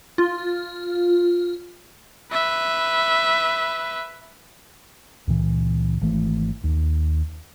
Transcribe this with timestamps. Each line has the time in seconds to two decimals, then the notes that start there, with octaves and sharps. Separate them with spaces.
0.18 F4
2.32 B4 E5
5.27 C#2 A#2 E3
6.01 G#1 E3 A3
6.64 D#2